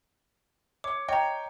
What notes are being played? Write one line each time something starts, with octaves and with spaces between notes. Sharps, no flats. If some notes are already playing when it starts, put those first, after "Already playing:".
C#5 D6
C#5 D#5 G5 A#5